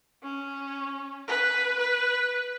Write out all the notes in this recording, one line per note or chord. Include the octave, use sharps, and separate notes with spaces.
C#4
B4
B4